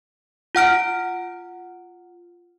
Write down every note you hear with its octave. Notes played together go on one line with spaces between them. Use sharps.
F4 F#5 F6 D7